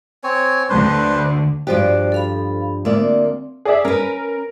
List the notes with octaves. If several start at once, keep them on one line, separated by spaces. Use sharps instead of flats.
C4 C#5 G#5
D2 D3 D4 B4 C5
G2 F3 F#4 G4 C5 D5
A4 F5 B5
D2 A#3 C4 D5
G#4 D5 E5
C#4 A#4 B4